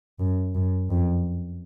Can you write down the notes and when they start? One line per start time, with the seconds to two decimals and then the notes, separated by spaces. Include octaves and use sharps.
0.19 F#2
0.55 F#2
0.90 F2